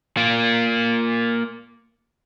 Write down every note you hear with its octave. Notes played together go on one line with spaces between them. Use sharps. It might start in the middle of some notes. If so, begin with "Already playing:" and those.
A#3 F4